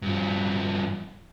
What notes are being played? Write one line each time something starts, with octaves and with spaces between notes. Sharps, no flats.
G2 F3